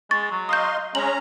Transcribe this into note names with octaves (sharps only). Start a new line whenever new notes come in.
G#3 C#6 A6
F#3
D#5 F5 C6 D#6 G6
G#3 C#4 A#5 F#7